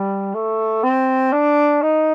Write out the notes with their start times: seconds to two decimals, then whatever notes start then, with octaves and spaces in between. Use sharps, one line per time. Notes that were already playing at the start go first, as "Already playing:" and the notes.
Already playing: G3
0.35 A3
0.84 C4
1.33 D4
1.82 D#4